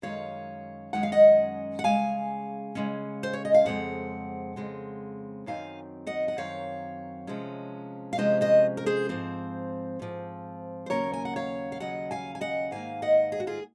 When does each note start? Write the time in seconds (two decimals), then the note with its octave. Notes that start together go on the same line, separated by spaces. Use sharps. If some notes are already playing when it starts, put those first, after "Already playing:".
0.02 F#2 D#3 G#3 C#4 C#5 F5
0.93 F#2 D#3 G#3 C#4 F#5
1.03 F5
1.12 D#5 F#5
1.79 F#5
1.84 C#3 G#3 C#4 F5 G#5
2.75 C#3 G#3 C#4
3.23 C5
3.33 C#5
3.45 D#5
3.54 F5
3.65 F2 C#3 G#3 C4 F#5
4.56 F2 C#3 G#3 C4
5.46 F#2 D#3 F#3 C4 F5 G#5
6.07 D#5 F#5
6.28 F#5
6.37 F#2 D#3 F#3 C4 C#5 F5
7.27 C3 F3 G#3 C#4
8.13 F5
8.18 C3 F3 G#3 C#4 C5 D#5
8.41 C5 D#5
8.77 A#4
8.86 G#4 C5
9.09 G#2 F3 C4
9.99 G#2 F3 C4
10.86 C5
10.90 D#2 C#3 F#3 A#3 C#4 A#4 C#5
11.13 G#5
11.25 F#5
11.36 C#5 F5
11.72 F5
11.80 D#2 C#3 F#3 C#4 D#5 F#5
12.11 F5 G#5
12.35 G#5
12.41 D#5 F#5
12.71 G#2 D#3 A#3 F5 G#5
13.02 D#5 F#5
13.32 G#4
13.40 F#4
13.47 F4 G#4